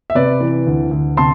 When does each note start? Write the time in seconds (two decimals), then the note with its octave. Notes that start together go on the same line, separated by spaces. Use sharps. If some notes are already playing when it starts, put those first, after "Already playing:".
0.10 E5
0.15 C3 B4 D5
0.40 E3
0.67 D2
0.91 D2
1.17 C3 A5 C6